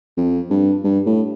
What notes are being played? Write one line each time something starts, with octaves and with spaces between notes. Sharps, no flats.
F2
G2
G2
A2